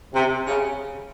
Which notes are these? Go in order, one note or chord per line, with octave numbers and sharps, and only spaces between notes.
C3
C#3